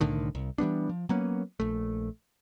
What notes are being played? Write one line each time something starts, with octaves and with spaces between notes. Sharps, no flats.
C2 A2 D3 D#3
C2
E3 G3 B3 D4
F3
F#3 A#3 B3 C#4
A#1 A3